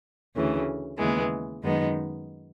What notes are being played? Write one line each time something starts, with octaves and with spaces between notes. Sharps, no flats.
D2 C#3 E3
D#2 C#3 E3 G#3 B3
F#2 D#3 G#3 B3 D#4